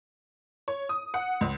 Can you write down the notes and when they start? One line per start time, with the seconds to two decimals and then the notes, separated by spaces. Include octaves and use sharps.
0.68 C#5
0.89 D#6
1.14 F#5
1.41 C#2